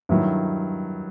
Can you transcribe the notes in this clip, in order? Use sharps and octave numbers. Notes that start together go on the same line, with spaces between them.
G2 D#3 F#3 E4